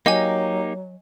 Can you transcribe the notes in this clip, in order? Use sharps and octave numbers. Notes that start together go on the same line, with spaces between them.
F#3 A#3 D#4 G4 D#5 G#5